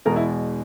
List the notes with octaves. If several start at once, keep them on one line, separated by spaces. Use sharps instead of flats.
E2 B2 G#3 A#4
E4